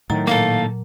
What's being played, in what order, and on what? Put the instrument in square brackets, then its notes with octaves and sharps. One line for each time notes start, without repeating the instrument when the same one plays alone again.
[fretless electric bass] A2 D#3 [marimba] F#3 A#5
[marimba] A#2 [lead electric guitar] A#3 A4 [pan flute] F5